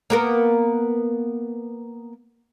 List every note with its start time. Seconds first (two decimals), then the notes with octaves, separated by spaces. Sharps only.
0.10 A#3 B3 A#4